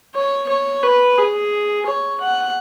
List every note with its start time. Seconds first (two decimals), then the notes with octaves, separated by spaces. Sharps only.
0.15 C#5
0.49 C#5
0.83 B4
1.18 G#4
1.86 C#5
2.21 F#5